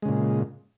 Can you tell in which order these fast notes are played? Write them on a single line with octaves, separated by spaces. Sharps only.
G#3 C#3 A#2